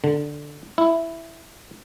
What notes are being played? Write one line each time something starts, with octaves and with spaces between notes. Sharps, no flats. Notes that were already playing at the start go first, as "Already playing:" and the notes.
D3
E4